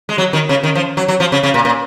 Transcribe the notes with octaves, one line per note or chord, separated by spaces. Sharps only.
G#3
F#3
D#3
C#3
D#3
F3
F#3
F#3
F3
C#3
C#3
A#2
A#2